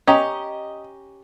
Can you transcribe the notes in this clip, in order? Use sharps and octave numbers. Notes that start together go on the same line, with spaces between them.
C#4 G4 D#5 A#5